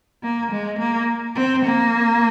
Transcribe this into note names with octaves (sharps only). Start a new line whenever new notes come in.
A#3
G#3
A#3
C4
A#3